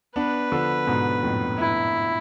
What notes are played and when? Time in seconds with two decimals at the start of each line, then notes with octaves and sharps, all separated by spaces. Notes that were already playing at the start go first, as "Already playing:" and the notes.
0.16 B3 D4 B4
0.52 D3 F3
0.87 G#2 B2
1.23 F2 A2
1.58 E4